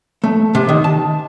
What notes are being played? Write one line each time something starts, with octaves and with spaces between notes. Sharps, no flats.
A3
C3
D#3
A5